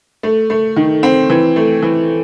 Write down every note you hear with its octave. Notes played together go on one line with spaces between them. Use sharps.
A3
A3
D#3
C4
E3
A3
E3